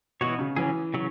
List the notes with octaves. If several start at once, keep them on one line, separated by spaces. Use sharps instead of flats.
B2 E3 B3 F#4 C#5
C#3
C#3 E3 F#3 C#4 G#4
C#3 F#3